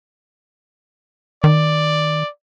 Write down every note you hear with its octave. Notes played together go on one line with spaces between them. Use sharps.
D#3 D5